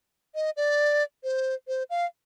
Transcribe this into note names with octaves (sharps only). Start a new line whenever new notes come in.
D#5
D5
C5
C5
F5